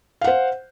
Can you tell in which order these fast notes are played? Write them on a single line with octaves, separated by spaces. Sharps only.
F5 F#5 C5